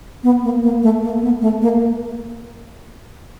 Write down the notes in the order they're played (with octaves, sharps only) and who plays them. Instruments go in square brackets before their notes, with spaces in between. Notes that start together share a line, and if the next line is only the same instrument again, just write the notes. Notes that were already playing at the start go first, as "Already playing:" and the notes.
[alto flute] B3
A#3
A#3
A3
A#3
B3
A3
A#3